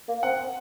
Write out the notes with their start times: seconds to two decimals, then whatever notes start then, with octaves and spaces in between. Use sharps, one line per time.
0.08 A#3
0.23 C4 F#5